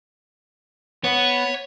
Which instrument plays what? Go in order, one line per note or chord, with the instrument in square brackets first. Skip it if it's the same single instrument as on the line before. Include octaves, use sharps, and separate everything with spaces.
[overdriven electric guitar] B3 [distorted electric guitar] C#5